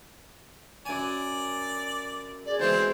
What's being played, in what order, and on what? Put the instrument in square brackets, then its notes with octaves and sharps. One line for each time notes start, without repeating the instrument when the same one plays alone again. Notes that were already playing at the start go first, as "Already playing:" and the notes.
[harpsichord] F#2 G#5 [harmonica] D5
[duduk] G#4 [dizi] D5
[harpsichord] B2 E3 G#3 [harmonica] C4 [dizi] C5